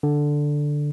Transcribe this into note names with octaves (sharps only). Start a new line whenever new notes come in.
D3